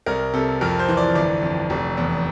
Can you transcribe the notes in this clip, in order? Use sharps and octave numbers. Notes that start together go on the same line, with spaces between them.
C2 A#4
C3 A4
F2 A#4
C5
E3
D5
G1 D5
F2
F1
E2